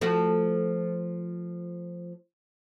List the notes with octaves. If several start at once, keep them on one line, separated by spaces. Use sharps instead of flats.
F3 A3 F#4